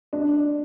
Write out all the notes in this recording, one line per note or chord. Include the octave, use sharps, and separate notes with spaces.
D4